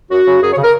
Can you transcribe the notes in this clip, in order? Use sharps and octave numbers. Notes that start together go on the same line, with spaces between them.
F#2 F#4
C#3
F#2 G#4
C#5
C#3
A#4